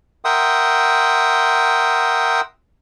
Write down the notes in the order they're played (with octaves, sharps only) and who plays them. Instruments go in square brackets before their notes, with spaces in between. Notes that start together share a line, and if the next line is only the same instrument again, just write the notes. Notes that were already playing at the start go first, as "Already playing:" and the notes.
[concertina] A#4 E5 F#5 G5 C6 D#6